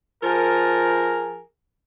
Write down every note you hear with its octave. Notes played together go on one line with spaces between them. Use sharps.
F3 G#4 A#4